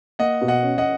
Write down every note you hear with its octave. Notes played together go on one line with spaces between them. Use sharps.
A#3 D#5 F#5
B2
D#5 F#5
C#4
D#5 F#5